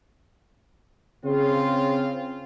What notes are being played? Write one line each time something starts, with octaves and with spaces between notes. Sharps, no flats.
C#3 C4 F4